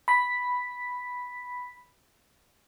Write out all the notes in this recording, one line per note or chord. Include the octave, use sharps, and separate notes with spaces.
B5 B6